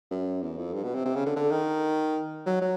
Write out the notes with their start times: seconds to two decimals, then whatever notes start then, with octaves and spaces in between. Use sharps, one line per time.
0.11 F#2
0.42 E2
0.58 F2
0.74 G2
0.84 B2
0.95 C3
1.05 C3
1.15 C#3
1.26 D3
1.36 D3
1.52 D#3
2.46 F#3
2.62 F#3